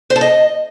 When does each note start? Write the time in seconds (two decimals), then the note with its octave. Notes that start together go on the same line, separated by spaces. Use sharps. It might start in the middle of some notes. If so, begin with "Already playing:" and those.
0.10 C5
0.16 A5
0.21 D#5